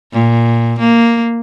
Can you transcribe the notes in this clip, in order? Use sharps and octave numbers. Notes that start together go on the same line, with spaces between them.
A#2
A#3